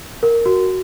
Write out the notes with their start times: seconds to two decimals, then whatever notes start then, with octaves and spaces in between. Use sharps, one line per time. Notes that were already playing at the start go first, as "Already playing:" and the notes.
0.23 A#4
0.46 F#4